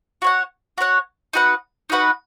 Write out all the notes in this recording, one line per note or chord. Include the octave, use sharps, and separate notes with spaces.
F#4 C#5 F#5
F#4 C#5 F#5
D#4 F#4 B4 F#5
D#4 F#4 B4 F#5